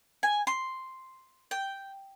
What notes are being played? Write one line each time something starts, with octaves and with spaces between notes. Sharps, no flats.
G#5
C6
G5